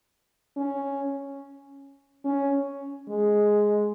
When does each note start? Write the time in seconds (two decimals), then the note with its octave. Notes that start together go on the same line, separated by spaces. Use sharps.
0.57 C#4
2.25 C#4
3.09 G#3